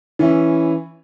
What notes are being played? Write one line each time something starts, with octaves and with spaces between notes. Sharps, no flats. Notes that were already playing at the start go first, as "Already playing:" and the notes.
E3 C#4 E4